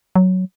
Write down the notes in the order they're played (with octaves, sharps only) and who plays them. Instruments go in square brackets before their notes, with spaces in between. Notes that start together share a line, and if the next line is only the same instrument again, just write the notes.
[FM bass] F#3